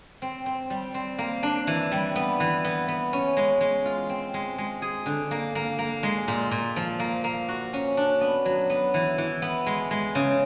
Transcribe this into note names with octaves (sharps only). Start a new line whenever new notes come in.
C4
C4
G3
C4
A#3
D4
E3
G3
B3
E3
B3
B3
C#4
G#3
G#3
F4
C4
G#3
G#3
G#4
D3
A#3
A#3
A#3
G#3
A#2
A#2
F3
A#3
A#3
F#4
C#4
D4
B3
F#3
B3
E3
E3
B3
G#3
G#3
C#3